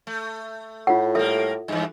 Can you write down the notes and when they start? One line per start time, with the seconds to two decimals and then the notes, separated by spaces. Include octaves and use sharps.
0.07 A3
0.87 A2 F4 F#5
1.15 G3 A#3 A4 E5
1.68 G2 E3